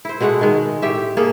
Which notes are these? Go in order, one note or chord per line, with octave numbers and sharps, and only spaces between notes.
E4 C5
B2 G#3 A3 F#5
D#3 G#3
A2 G4 E5
A#3 G#4 A4